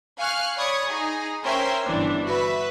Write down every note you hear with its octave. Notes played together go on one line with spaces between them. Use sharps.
F5 G#5 C#6 F6 F#6
C#5 D5 B5 C#6 D#6 G#6
D#4 G#4
C#4 A#4 C5 E5 G5 C6
G1 E3 D4
F#4 B4 E5